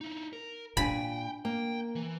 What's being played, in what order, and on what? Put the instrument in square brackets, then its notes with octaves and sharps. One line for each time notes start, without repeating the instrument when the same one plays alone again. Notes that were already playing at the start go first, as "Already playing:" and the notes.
[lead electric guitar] D#4 E4
A#4
[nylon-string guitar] A#2 A#4 G#5 [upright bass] D4 [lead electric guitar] G5 [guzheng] B5
[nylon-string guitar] A#3 [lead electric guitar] G5
[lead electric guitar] E3